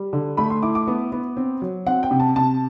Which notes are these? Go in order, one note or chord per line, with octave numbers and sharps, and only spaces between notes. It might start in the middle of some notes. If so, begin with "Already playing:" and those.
Already playing: G3
D3
A3 B5
C6
E4 D6
D6
B3
B3
C4
F#3
C4 F#5
G5
C3
A5
C3 A5